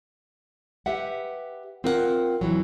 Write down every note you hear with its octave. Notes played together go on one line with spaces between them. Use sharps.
G4 B4 E5 F#5
C4 F4 A#4 C5 D5 F#5
F2 E3 F#3